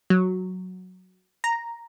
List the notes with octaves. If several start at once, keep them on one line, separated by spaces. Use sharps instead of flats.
F#3
A#5